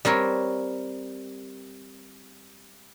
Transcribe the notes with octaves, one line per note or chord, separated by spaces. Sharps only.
G3 C4 A#4 C#5